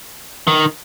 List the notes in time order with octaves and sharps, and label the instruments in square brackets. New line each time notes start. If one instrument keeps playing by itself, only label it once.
[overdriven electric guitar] D#3